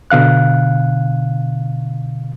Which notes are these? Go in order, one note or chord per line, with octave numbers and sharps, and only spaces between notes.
B2 D3 F5 F#6